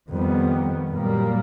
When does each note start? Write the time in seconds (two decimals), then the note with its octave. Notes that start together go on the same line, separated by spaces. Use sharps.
0.10 F2 D#3 G3 B3
0.91 F#2 A#2 G3 A#3